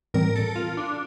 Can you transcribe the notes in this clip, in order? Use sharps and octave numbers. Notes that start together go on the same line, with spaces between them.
A2 E3 G3 C4 A#4
A4
F4
D4